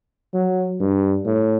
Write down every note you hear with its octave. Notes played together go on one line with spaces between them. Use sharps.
F#3
G2
A2